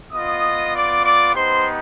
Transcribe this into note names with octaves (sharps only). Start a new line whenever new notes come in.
B3 F4 D#5 D#6
D5 D6
D5 D6
B3 D#4 G4 C5 C6